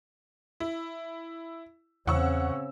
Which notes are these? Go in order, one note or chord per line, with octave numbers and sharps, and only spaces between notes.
E4
E2 C#3 C4 F#5 C#6 E6